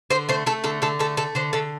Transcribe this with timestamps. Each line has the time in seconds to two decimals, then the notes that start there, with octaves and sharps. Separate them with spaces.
0.10 D3 C5
0.29 A3 C5
0.46 A3 A4
0.64 D3 A4
0.82 D3 A4
0.99 A3 A4
1.17 A3 A4
1.35 D3 C5
1.53 D3 A4